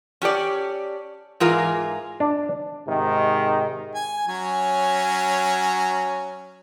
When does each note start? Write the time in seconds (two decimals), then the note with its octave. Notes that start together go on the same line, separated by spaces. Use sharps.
0.22 C#4 G4 A4 D5
1.40 G#2 E3 F4 G#4 A#4 F5
2.20 D4
2.88 G#2 C3 D#3
3.95 G#5
4.27 F#3 C#4 G#5